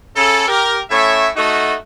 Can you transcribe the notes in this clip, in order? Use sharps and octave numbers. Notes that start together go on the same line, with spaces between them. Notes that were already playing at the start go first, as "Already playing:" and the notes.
C#3 A4
G4 A#4
A2 A3 C#4 C#5 E5
A3 D#4 F#4